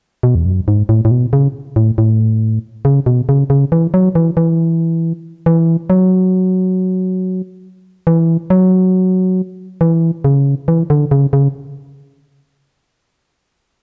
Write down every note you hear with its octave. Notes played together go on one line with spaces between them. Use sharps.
B2
E2
F#2
G#2
A2
A2
B2
C#3
A2
A2
C#3
B2
C#3
C#3
E3
F#3
E3
E3
E3
F#3
E3
F#3
E3
C#3
E3
D3
C#3
C#3